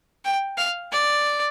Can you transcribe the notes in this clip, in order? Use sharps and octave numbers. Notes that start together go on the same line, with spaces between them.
G5
F5
D5